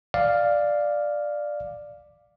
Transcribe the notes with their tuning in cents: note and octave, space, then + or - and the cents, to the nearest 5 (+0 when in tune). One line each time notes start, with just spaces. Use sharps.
D5 +5 F5 +0